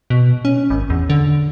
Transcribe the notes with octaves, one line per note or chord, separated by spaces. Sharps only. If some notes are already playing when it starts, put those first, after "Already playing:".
B2
C#4
G#1
E2
D3